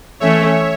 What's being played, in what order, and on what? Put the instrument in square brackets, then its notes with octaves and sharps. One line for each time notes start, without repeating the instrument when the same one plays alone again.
[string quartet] E3 A3 C#4 [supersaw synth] C#5 E5